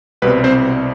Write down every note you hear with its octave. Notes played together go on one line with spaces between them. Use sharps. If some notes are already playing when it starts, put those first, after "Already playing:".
C2 B2 G3 C4 B4
C4 C5